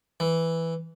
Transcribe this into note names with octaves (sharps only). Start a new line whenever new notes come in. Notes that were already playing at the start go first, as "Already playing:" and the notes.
E3